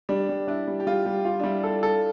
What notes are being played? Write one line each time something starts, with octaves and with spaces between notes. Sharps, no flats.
G3 D4
G3
D4 E4
G3
G4
G3 F4
G3 G4
F4 G4
D4
G3 E4
A4
A4